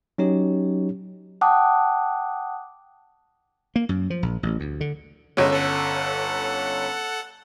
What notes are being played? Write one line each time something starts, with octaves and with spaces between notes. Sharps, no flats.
F#3 C#4 D#4 G4 C#5
F#5 G5 A5 D6 D#6 F#6
A#3
F#2
F3
A#1
A1
D2
D3
G1 G#3 C#4 F#4
A4 F#5